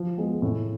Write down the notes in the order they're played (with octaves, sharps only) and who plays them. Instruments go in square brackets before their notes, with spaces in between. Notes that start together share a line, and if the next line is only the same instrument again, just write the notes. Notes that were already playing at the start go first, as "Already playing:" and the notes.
Already playing: [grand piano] F3
G#3 B3
A2